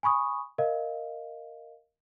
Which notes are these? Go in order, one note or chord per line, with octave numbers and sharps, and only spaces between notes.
G#5 B5 C#6 D#6
A#4 D#5 F5